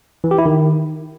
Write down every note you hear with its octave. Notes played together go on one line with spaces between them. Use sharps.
E3
G4
E4
D#3